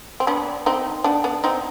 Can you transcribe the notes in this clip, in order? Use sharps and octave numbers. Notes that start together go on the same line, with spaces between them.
C4
B3 D4
C4 D#4
B3 D4
B3 D4
C4 D#4